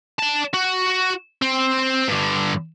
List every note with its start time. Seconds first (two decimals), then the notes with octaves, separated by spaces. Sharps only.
0.19 D5 A5
0.54 F#4
1.42 C4
2.09 G2 D3